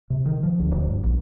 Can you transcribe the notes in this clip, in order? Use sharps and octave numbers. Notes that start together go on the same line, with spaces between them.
C3
D#3
F3
D2
D1
G2
A#1